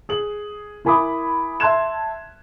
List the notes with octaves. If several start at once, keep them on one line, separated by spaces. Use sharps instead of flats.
G#4 F#7
E4 A#4 G#5 B5 D6 D#6
E5 A5 C6 F#6 G#6 E7